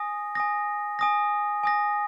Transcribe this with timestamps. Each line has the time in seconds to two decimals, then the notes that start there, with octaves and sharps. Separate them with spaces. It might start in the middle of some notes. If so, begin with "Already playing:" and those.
Already playing: G#5 D#6 A#6
0.35 G#5 D#6 A#6
0.99 G#5 D#6 A#6
1.63 G#5 D#6 A#6